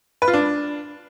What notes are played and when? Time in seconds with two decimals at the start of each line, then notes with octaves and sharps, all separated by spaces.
0.22 B4
0.28 F4
0.33 D4